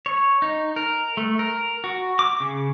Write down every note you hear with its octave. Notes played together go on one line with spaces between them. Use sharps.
C#5
D#4
A#4
A3
A#4
F#4
D6
C#3